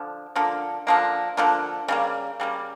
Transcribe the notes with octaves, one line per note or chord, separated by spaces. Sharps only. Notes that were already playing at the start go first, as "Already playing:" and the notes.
Already playing: D3 F3
D3 F3 A#3
D3 F3 A#3
D3 F3 A#3
C#3 G3 A#3
C#3 G3 A#3